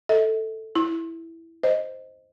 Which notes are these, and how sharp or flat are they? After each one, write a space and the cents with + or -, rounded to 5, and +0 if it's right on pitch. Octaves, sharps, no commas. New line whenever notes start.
A4 +5 D#5 +45
E4 +0 C6 +40
C5 +0 D#5 +0